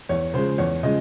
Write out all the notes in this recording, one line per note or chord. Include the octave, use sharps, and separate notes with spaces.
E2 C#5
C#3 F3 G#3 C5
E2 C#5
C#3 F3 G#3 D#5